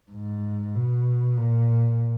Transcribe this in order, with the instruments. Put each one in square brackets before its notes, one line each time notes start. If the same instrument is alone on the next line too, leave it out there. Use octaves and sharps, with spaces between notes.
[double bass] G#2
B2
A#2